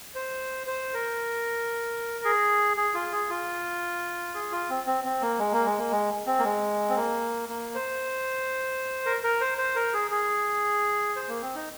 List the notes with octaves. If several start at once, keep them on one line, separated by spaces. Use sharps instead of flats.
C5
C5
A#4
G#4
G#4
F4
G#4
F4
G#4
F4
C4
C4
C4
A#3
G#3
A#3
G#3
A#3
G#3
C4
A#3
G#3
C4
A#3
A#3
C5
A#4
A#4
C5
C5
A#4
G#4
G#4
C5
A#3
C4
D#4